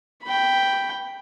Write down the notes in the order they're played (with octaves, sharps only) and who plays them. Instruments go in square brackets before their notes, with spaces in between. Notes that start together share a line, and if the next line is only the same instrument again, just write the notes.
[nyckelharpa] G5 B5